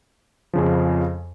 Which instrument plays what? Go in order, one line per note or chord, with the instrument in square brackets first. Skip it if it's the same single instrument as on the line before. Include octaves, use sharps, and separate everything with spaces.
[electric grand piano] F2 C#3 F3